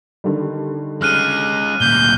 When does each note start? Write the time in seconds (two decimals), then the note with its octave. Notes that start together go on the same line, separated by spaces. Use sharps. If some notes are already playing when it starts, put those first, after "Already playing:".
0.24 D3 D#3 G3
1.02 G#3 C#4 F6 F#6 D#7
1.81 D2 A#2 G6